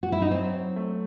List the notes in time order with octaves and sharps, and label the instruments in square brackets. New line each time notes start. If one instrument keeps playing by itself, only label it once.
[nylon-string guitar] F#4
E4
D#4
[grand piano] F#3 [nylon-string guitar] C4
[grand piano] F#3
A3